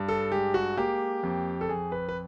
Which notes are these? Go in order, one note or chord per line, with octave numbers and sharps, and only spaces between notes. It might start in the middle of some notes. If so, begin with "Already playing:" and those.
Already playing: G2
A4
G#3 G4
F#4
A#3 G4
F2
A4
F2 G#4
B4
B4